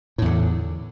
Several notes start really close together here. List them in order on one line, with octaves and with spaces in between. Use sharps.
A2 E2 D3